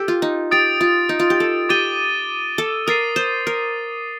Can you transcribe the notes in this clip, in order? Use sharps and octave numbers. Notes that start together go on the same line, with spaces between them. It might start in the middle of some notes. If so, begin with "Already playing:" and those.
Already playing: G4 A4
F4
D#4
G4 D#6 A6 D7
F4
D#4
F4
G4
A4
G4 D6 A6 D#7 G7
A4
A#4 D#6 A6 C7 D#7
C5
A#4